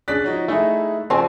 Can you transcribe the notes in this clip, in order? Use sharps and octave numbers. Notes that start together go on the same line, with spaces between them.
C#4 D4 G#4 F#6 A6 B6
F3 D#4 F#4 C#5
A3 D#4 E4 G#4 E5
C#3 F3 C4 C#4 C5 D5 G#5 A5